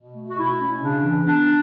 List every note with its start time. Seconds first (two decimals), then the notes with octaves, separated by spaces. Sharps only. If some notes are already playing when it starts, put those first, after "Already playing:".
Already playing: B2
0.16 A3
0.29 F#4
0.37 B2 E4
0.60 C#4
0.82 C#3 D4
1.04 E3
1.26 B3 D4